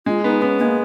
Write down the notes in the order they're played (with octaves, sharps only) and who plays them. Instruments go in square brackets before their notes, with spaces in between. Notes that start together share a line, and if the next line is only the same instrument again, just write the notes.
[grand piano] G#3 [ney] F4
[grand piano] B3 [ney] D#4
[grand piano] B3 [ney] C#4
[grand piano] G#3 [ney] A#3